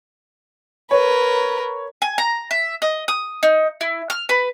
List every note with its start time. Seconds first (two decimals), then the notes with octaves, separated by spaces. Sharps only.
0.91 A#4 B4 C#5
2.02 G#5
2.18 A#5
2.51 E5
2.82 D#5
3.08 D#6
3.43 D#4
3.81 E4
4.10 F6
4.29 B4